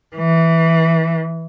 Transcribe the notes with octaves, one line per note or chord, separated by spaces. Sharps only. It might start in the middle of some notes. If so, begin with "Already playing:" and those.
E3